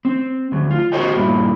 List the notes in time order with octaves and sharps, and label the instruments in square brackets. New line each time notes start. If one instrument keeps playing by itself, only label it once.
[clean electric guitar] C4
D2 F#3
F4
F#4 G#4 C5 C#5 D#5 G5
G2 A#2 D4 E4